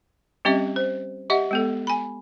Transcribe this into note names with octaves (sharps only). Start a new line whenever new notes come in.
G3 C4 C#4 G4 D#5 E5
C5
G4 D#5 E5 F#5
G#3 B3 A4
G#5 B5